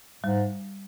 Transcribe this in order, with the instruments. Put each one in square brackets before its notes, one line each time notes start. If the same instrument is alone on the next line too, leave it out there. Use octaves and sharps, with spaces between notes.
[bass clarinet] G#2 [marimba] G3